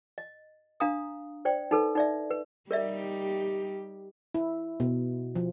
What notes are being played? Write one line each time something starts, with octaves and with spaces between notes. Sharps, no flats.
D#5
D4 F5 A#5 D#6
C5 D5 G5
D#4 A4 B4
D#4 D5 E5
B4
G3 D#4 G4 A#4 D5 E5
E4
B2
F3